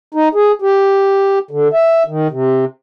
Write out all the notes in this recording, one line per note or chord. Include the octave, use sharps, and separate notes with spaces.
D#4
G#4
G4
D3
E5
D#3
C3